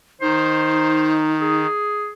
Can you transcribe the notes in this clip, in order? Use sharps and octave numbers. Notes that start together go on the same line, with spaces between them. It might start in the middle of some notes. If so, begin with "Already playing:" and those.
D#3 D#4 C5
G#4